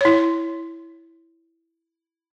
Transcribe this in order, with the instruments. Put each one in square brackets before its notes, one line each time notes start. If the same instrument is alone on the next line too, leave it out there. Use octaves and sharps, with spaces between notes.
[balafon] E4 C#5